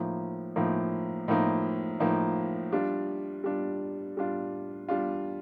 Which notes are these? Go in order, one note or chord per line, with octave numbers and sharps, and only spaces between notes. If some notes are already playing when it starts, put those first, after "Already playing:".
Already playing: A2 F3 A#3 D#4
A2 F3 A#3 D#4
A2 F3 A#3 D#4
A2 F3 A#3 D#4
G3 D4 F4
G3 D4 F4
G3 D4 F4
G3 D4 F4